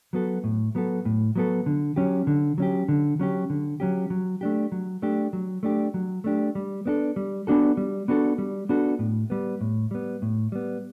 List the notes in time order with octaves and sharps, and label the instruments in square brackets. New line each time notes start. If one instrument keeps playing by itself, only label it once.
[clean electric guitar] F#3 B3 F#4 A4
A2
F#3 B3 F#4 A4
A2
F#3 B3 F#4 A4
D3
F#3 C#4 G4
D3
F#3 C#4 G4
D3
F#3 C#4 G4
D3
F#3 C#4 G4
F#3
A3 D4 G4
F#3
A3 D4 G4
F#3
A3 D4 G4
F#3
A3 D4 G4
G3
B3 D4 F#4 A4
G3
B3 D4 F#4 A4
G3
B3 D4 F#4 A4
G3
B3 D4 F#4 A4
A2
G3 B3
A2
G3 B3
A2
G3 B3